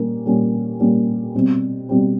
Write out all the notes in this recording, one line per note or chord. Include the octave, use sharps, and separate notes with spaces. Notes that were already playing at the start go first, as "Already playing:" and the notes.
Already playing: A#2 G3 A#3 C#4
A#2 G3 A#3 C#4
A#2 G3 A#3 C#4
B2 G3 C4
B2 G3 C4